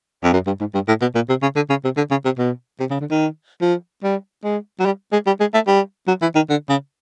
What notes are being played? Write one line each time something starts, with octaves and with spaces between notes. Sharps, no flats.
F2
F#2
G2
G#2
G2
A2
B2
A#2
C3
C#3
D3
C#3
C3
D3
C#3
C3
B2
C3
C#3
D3
D#3
F3
G3
G#3
F#3
G3
G#3
G3
G#3
A3
G3
F#3
E3
D#3
D3
C#3